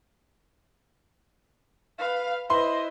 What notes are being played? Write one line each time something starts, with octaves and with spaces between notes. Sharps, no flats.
B4 F5
E4 B4 C5 D#5 C6